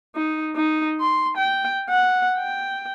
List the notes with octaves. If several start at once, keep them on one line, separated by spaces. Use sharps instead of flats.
D#4
D#4
C6
G5
F#5
G5